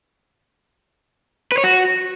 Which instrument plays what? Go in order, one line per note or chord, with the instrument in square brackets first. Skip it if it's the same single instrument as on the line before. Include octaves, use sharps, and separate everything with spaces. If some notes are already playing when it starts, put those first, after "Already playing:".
[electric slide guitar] B4
C#5
F#4